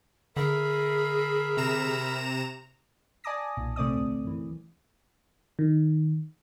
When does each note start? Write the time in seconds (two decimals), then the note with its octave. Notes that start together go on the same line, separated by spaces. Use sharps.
0.37 D3 G#4 A#4 E5 B5
1.57 C3 A#5 E7
3.24 D5 G#5 A5 D6 D#6 A#6
3.57 B1 A#2
3.76 C3 A3 C4 D5 D#6
3.96 D2
4.24 F#2 E3
5.59 D#3